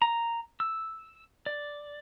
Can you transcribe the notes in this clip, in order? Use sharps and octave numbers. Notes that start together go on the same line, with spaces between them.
A#5
E6
D5